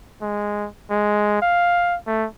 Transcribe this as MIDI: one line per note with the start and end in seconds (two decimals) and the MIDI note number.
0.22 0.67 56
0.90 1.39 56
1.42 1.96 77
2.07 2.27 57